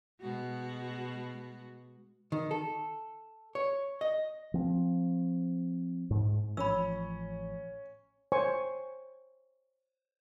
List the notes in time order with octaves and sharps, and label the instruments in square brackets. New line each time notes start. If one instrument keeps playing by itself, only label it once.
[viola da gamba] B2 G#3 F#4
[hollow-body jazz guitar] D#3
A4
C#5
D#5
[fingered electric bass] F3 C4
G#2
[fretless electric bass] A1 F3 [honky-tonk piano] C#4 [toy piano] B5 E6
[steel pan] C5 C#5 G#5 C#6